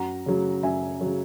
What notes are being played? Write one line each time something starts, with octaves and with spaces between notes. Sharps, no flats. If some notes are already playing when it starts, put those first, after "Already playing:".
Already playing: F#2 F#5 A#5
C#3 F#3
F#2 E5 G#5
C#3 F#3